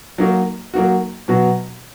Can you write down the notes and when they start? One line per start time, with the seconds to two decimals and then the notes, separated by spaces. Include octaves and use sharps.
0.18 F#3 A#3 D#4 F#4
0.74 F#3 A#3 D#4 F#4
1.28 B2 F#3 B3 F#4